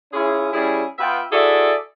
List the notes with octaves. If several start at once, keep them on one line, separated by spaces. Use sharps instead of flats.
C#4 E4 F4 G#4
G3 C#4 E4 G#4
B3 F4 B4 E5 G5
E4 F#4 G#4 A4 D5 E5